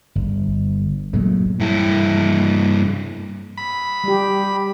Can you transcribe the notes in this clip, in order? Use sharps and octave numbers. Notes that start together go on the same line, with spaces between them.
G1
A#2 F#3 G#3 A3
G2 E4
B5
G3 G4